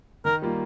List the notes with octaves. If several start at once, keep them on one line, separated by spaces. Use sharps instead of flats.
D#3 A#4
G3 A#3 F4